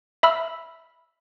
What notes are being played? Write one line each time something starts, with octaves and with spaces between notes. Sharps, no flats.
E5 B5 E6 F6